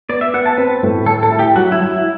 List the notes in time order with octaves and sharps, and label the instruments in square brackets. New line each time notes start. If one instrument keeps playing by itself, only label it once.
[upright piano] B3 [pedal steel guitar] D5
[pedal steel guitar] E5
[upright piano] B3 [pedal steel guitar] F#5
[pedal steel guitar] A5
[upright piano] C4 [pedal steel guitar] B4
[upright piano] A2
[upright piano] A2 [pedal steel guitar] A4
[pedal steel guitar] A4
[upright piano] E4
[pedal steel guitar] G4
[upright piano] F#3 [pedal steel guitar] F#4
[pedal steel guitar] E4
[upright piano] F#3
[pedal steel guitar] E4